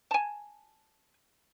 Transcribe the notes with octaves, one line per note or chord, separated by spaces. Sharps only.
G#5 A5